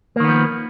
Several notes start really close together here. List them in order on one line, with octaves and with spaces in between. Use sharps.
A#3 D#3 B3 F3